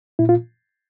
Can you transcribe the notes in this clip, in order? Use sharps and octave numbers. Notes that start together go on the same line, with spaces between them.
A#2 E4
F4